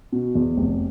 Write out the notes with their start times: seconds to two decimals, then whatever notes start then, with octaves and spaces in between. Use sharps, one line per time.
0.12 B2
0.35 E2
0.57 F1